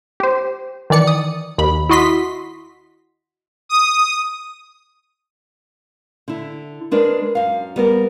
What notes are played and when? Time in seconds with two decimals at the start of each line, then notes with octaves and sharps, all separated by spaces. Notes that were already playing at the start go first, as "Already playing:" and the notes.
0.20 G4 C5
0.90 D#3 E3 D5 C#7
1.07 D#6
1.58 D#2 B5
1.89 E4 F#4 D#5 C6 B6
3.69 D#6
6.28 D3 E4
6.91 G#3 D4 A#4 B4
7.35 F#2 F5
7.76 G3 B3 A#4